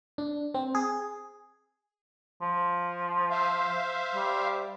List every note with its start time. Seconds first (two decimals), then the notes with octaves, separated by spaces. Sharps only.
0.18 D4
0.54 C4
0.75 G#4
2.42 F3
3.31 C5 E5 F5
4.15 G3